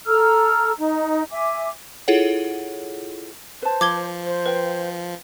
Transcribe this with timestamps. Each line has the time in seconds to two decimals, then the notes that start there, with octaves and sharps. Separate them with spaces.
0.07 A4 A#5 E6 F6
0.77 D#4
1.31 E5 G#5 D6
2.08 E4 F4 G#4 A4 C#5 F#5
3.62 B4 C5 A5
3.81 F3 D6 G#6 G7
4.24 C5
4.46 B4 F5 G5